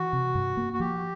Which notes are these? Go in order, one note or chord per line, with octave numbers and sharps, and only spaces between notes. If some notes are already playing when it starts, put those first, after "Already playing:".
Already playing: E3 F#4
C3
G2
A#3
F#4
F3 G4